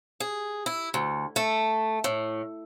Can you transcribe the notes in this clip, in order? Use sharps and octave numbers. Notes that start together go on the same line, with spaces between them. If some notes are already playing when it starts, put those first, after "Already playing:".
G#4
E4
D2
A3
A2